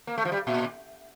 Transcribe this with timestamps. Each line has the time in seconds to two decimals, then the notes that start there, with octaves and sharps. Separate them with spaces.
0.07 A#3
0.18 A3
0.25 F3
0.32 G3
0.47 A#2